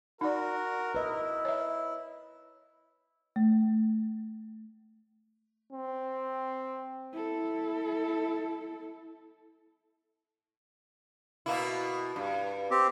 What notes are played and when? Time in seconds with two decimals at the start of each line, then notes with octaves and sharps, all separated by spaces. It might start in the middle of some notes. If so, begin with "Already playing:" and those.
0.21 D#4 F#4 A#4 D5
0.95 E4 B4 D#5
1.45 C#5 E5
3.36 A3
5.73 C4
7.12 E4 A4
11.46 B2 A#3 E4
12.16 G2
12.71 C4 G4